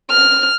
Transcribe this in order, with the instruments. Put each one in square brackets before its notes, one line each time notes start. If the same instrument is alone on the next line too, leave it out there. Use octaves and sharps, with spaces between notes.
[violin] F6